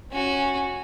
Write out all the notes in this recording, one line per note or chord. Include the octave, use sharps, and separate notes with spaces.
C#4 F#4